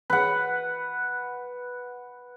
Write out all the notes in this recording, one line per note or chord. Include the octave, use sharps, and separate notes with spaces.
B4 F#5